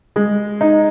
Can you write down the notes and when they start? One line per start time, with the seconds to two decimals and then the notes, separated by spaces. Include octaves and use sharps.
0.16 G#3
0.61 D#4